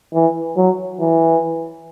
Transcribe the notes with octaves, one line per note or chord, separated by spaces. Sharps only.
E3
F#3
E3